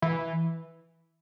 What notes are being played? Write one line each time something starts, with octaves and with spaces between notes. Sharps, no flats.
E3